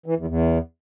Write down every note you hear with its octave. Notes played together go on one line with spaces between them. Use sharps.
E3
E2
E2